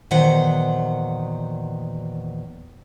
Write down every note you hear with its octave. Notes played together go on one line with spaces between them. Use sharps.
E2 A#2 D#3 F#3 C5 F#5